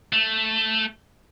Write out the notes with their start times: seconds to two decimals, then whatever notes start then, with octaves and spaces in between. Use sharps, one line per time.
0.13 A3